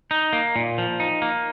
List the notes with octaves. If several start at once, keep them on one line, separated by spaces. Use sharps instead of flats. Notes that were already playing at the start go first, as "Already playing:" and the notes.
D#4
A#3
A#2
F3
D#4
A#3